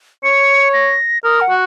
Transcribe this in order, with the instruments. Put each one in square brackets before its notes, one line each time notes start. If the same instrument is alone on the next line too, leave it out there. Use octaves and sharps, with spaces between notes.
[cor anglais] C#5 [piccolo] C#7
[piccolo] A#6
[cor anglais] A#4 [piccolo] D#6
[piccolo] F#5
[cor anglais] F#4